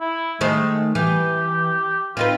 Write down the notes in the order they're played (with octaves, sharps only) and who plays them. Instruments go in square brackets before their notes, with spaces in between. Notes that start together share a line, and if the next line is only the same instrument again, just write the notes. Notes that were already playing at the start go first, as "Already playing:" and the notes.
[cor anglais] E4
[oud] D#3 A3 C5 [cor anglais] G#3
[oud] E3 [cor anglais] G4
[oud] C4 D#4 B4 [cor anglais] F4